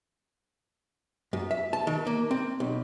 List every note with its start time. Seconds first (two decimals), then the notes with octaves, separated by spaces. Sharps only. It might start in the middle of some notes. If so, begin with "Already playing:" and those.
1.33 F#2
1.51 E5
1.73 A5
1.87 D#3
2.07 A#3
2.31 C4
2.60 B1